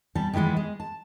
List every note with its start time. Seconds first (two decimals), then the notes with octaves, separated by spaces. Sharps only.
0.15 E2 G3 A5
0.33 D#3 E3 G3 G#3 B3
0.56 G#3
0.80 A5